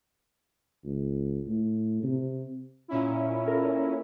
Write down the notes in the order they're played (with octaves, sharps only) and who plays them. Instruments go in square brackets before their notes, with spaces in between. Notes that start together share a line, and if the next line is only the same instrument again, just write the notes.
[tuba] C#2
A2
C3
[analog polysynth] A#2 C#4 E4
[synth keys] A4 A#4